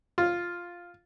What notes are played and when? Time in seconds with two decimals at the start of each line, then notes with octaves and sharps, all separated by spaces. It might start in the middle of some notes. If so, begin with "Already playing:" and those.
0.18 F4